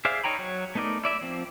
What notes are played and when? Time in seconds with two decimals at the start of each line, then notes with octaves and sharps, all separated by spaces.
0.05 G#4 C5 D5 E5 F5
0.24 D#4 C#5 G5 A#5 B5
0.39 F#3 C#5
0.75 A3 B3 D#4 A#4 D5
1.04 E4 D5 E5
1.21 F3 C4